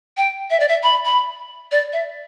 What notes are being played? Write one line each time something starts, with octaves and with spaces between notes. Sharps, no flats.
G5
E5
D5
E5
B5
B5
D5
E5